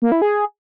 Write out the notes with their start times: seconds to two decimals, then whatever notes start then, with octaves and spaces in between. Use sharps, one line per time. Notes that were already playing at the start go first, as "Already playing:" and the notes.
0.02 A#3
0.12 E4
0.22 G#4